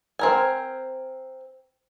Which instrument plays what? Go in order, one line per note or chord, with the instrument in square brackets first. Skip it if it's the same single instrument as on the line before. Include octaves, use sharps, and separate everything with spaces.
[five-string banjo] C4 A#4 G#5